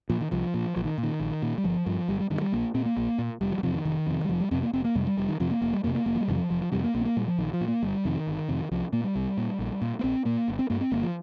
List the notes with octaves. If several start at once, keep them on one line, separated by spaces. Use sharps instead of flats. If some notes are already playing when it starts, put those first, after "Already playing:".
A#2 F3
D#3
C2 F3
A#2
A#1 F3
D#3
A#2
D#3
A#1
A#2
G3
G1 F3
G2 F3
G1 G3
G3
G2 D#3
G3
A#1 A#3
A#2 C4
A#3
A#1 A#3
A#2
F1 G3
F3
G3
F2 C3 F3
D#3
F1 D#3
F2 C3
G3
F1 F3
G3
F2 C3 C4
A#3
F1 C4
A#3
F2 C3 G3
G3
F1 G3
D#3
F2 C3 F3
A#3
F1 A#3
G3
F2 C3 A#3
A#3
F1 A#3
F3
G3
F2 C3 D#3
F3
F1 F3
F3
F2 C3 G3
A#3
A#1 A#3
C4
A#3
A#2 G3
F3
A#1 D#3
F3
A#2
A#3
G1 G3
F2 C3 D#3
G1
F2 C3
C2 F3
A#2 A#3
G3
C2
A#2
A#1
A#2
A#3
A#1 C4
A#2 A#3
G1
C4
G2 A#3
C4
G1 A#3
F3